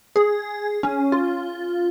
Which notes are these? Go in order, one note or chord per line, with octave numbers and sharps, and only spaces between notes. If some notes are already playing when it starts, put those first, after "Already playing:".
G#4
C#4
F4